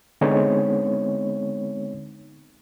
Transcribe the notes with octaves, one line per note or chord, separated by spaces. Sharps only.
D3 G#3 B3 C4 D#4 C#5